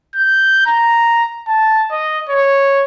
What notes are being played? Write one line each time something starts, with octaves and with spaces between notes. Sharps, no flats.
G6
A#5
A5
D#5
C#5